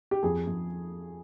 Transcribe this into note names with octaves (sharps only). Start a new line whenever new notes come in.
G4
F2 G#4
F2